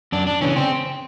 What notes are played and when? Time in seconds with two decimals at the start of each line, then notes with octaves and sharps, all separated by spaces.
0.12 F#2 D4
0.27 D4
0.41 C#3 E3 C#4
0.56 C4